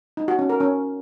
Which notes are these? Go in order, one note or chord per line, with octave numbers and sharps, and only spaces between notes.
D#4
F#4
C#4
A#4
C#4